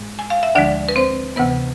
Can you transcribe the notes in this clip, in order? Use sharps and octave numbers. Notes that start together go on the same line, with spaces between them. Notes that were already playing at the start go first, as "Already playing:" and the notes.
Already playing: G#2 G#3
G#5
F5
E5
D2 D3 F3 G#3 D4 D5
B4
C4 C5
D2 C3 E3 B3 B4